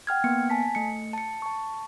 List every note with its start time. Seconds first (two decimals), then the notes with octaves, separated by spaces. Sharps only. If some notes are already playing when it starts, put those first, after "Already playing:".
0.07 F#5 G5 F6 G#6
0.24 A#3 B3 C#7
0.50 G#5 A5 B6
0.75 A3 C#7
1.13 A5 C#7
1.42 A5 C#6